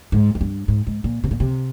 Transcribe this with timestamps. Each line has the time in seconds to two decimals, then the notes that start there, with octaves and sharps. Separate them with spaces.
0.12 G#2
0.35 F2
0.41 G2
0.68 G#2
0.87 G#2
1.04 A#2
1.24 C3
1.31 A#2
1.40 C3